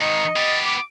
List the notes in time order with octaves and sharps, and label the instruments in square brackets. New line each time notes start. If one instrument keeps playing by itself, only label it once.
[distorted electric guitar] G#2 D#3 [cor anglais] D#5 [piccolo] C#7
[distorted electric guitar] B3 G4 [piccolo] A6
[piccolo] D6